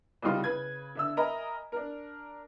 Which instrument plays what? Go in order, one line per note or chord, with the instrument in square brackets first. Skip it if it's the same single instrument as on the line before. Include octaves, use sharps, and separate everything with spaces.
[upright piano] C2 C#3 G3 D#4 F4 C6
C#3 B4 G#6
D3 E5 E6
A#4 D#5 E5 G#5 A#5 B5
D4 A#4